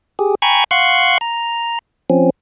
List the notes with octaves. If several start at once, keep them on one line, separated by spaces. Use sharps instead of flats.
G4 G#4
G5 G#5 A#5 B5 C#6 G#6
F5 F#5 C6 C#6 F#6
A#5
F3 C4 C#4